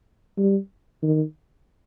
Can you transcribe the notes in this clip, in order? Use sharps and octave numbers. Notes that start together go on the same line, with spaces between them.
G3
D#3